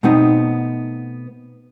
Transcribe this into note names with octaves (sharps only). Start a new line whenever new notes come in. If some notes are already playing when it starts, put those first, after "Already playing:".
B2 A3 B3 C4 D#4